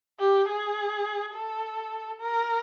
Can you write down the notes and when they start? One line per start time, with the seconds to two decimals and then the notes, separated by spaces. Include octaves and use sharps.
0.20 G4
0.49 G#4
1.34 A4
2.20 A#4